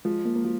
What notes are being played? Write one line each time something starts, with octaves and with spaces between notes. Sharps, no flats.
F3 G#3
A#3
A#3
F3